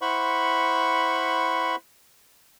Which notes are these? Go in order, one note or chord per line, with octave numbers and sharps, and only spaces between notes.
E4 C5 F#5 B5 C#6